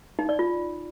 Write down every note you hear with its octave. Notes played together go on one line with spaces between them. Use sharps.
D#4
D5
F4